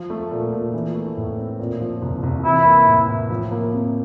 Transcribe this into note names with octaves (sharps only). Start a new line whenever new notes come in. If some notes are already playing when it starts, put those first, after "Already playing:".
Already playing: F3
A3
A#2
A#2
E3
A3
A2
C4
A#2
F3
C2
C2
E3 E4
A#3
A2
A2
F3
A#3
C3